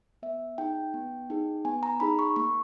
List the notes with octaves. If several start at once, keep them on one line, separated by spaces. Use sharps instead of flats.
B3 E5
D#4 G#4 G5
B3
D#4 G#4
B3 G#5
A#5
D#4 G#4 B5
C#6
A#3 C#6